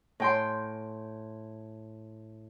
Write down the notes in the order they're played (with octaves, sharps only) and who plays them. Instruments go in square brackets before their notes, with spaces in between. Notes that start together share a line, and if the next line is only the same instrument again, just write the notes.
[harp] A2 G5 C6